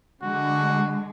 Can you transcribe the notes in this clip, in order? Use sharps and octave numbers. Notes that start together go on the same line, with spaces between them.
D3 G#3 F#4